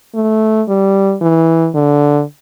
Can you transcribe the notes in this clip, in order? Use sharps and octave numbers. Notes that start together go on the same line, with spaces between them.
A3
G3
E3
D3